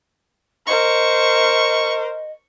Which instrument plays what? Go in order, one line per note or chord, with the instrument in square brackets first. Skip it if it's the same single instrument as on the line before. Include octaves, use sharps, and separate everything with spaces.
[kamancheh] A#4 C5 [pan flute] D#5 [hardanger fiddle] C#6